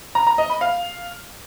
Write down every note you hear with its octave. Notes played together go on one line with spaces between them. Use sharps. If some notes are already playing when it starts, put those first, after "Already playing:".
A#5
A#5
D#5
B5
F5